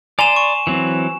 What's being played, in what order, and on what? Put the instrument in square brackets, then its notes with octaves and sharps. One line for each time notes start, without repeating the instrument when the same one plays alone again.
[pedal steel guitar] D5 A#5 C6 [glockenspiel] G#5 E7
[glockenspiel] C#6
[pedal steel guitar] E3 F#3 C4